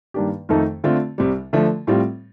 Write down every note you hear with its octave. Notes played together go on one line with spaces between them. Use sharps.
G2 D#3 A#3 D4 G4
F2 D#3 A3 D#4 A4
D3 A3 C4 F4
C2 C3 G3
D3 F3 A3
A2 G3 C4 F4